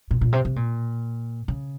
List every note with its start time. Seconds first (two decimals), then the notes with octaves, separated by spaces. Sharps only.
0.11 A#2
0.21 A#2
0.33 C3
0.45 C3
0.56 A#2
1.48 C#3